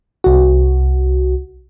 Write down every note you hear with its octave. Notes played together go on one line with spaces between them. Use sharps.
C2 F#4